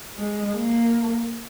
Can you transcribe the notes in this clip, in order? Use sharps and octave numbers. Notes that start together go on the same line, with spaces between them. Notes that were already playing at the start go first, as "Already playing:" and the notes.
G#3
A#3